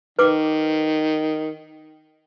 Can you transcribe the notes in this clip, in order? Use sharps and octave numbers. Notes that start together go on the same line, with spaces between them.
D#3 B4 D6